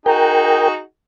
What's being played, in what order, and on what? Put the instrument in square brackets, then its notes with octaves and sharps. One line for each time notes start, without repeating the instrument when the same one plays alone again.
[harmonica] D#4 F#4 G#4 [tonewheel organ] A#4 G5